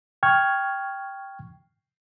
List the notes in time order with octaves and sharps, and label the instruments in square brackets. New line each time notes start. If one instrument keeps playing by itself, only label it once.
[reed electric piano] G5 C#6 F6 G#6